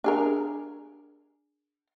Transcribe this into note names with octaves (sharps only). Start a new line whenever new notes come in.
D4 G#4 A#4